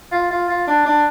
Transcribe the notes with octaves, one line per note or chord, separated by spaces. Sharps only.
F4
F4
F4
D4
D4